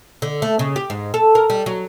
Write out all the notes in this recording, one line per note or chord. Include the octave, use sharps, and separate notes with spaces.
D3
A3
C#3
G4
G#2
A4
A#4
G3
F#3